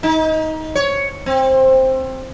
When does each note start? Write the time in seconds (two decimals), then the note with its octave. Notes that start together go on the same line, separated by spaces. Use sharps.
0.03 D#4
0.75 C#5
1.26 C4